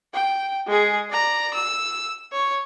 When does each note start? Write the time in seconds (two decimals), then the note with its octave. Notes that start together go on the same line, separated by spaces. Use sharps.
0.13 G5
0.67 G#3 G#4
1.11 D5 A#5
1.54 E6
2.32 C#5